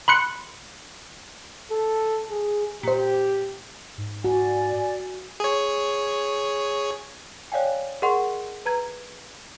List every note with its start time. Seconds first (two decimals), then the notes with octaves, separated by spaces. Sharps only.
0.08 B5 C6 F#6 C#7
1.71 A4
2.30 G#4
2.83 A#2 G4 C5
3.98 G#2
4.24 F#4 D5 G#5
5.40 G#4 C#5
7.52 C#5 D5 F5 G5 G#5
8.02 G#4 A#4 D#5 F#5 C6 C#6
8.66 B4 A#5 G#6